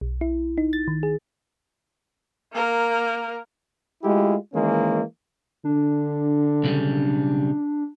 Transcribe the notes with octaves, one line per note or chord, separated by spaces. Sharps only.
B1
E4
D#4
A6
D#3
G#4
A#3 A#4
G#3 A3 E4 F4 G4
D#3 E3 G#3 A#3 C#4
D3 D4
B1 C#3 G3